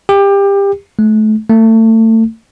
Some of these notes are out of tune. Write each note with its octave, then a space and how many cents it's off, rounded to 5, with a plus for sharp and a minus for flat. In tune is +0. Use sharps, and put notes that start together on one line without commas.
G4 +25
A3 -30
A3 +30